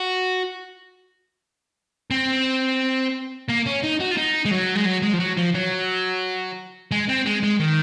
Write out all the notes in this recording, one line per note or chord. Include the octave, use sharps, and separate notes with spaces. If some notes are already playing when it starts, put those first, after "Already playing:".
Already playing: F#4
C4
A#3
C#4
D#4
F#4
F4
D#4
G#3
F#3
G#3
F#3
G#3
F3
F#3
F3
F#3
G#3
C4
G#3
G#3
D#3